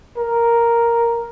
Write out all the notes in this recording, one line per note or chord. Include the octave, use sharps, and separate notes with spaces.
A#4